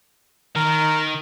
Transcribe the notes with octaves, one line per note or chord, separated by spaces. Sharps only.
D#3 A#4